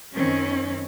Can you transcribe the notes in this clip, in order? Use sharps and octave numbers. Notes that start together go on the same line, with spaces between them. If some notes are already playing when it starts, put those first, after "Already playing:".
F#2 D#3 C4 C#4